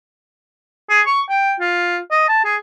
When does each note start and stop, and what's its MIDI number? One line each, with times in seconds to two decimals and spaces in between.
0.90 1.01 68
1.07 1.21 85
1.29 1.55 79
1.60 1.98 65
2.11 2.28 75
2.29 2.42 81
2.45 2.56 68